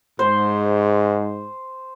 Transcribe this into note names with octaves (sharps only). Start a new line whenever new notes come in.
G#2 C5